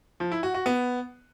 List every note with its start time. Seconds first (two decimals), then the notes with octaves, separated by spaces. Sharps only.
0.20 F3
0.32 E4
0.43 F#4
0.54 F#4
0.66 B3